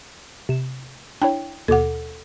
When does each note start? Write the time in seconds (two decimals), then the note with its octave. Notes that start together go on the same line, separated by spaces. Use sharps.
0.49 C3 E7
1.22 D4 E4 C#5 G5
1.68 D#2 B2 A4 F#5 D6